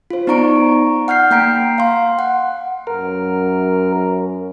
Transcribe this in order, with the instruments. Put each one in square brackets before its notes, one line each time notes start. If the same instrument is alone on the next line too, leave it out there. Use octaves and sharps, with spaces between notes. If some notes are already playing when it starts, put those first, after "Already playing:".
[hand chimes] F4 C5
B3 D#4 D5 A#5 C#6 D7
F#5 F6 G6 C7
A#3 G5 A#5 B6 D7
F5 C6
F#5
[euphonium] F#2 [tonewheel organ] A#4